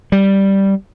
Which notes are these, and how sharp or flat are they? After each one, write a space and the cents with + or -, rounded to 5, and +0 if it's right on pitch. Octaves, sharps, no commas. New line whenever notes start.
G3 -5